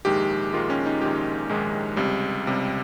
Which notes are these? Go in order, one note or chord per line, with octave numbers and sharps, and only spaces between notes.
A#1 G#2 D#3 G#3 G4
A#1 G#2 D#3 G#3 F4
C#4
D#4
A#1 G#2 D#3 G#3 G4
A#1 G#2 D#3 G#3
C#2 C3 G3
C#2 C3 G3